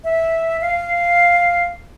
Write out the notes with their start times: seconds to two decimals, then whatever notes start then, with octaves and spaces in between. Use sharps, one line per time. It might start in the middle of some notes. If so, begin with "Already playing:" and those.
0.04 E5
0.61 F5